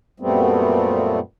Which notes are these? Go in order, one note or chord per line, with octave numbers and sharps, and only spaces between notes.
F#2 A#2 G3 A3 B3 C4